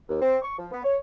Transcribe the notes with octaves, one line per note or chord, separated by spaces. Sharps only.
D#2
C4
C#6
F3
B3
C#5